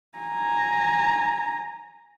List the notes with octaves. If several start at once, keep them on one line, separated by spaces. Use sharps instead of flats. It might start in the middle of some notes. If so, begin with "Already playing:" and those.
G#5 A#5